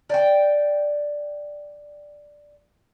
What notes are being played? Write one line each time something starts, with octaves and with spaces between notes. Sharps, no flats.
D5 G5